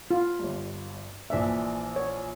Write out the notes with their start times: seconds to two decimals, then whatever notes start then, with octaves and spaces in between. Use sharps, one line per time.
0.11 F4
0.39 G1 G2
1.30 A#1 E3 D4 E5
1.96 C#5